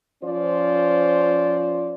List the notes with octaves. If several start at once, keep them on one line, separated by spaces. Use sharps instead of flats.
F3 C#4 F4 C5 D5